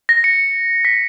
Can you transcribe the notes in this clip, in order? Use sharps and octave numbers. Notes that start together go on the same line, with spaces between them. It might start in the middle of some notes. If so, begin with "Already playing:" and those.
A#6
C#7
B6